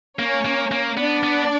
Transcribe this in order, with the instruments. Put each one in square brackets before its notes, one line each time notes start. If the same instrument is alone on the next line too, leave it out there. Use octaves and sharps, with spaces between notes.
[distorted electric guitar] A#3 [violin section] C#4 C#5
[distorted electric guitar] A#3
A#3
[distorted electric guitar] B3 [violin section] D4 D5
[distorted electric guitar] B3